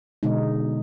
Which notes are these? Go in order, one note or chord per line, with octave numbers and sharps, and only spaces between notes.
B2 D3 G#3 D#4